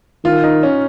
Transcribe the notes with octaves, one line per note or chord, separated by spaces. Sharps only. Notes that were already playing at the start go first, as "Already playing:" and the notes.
D#3 F4
D#4
C#4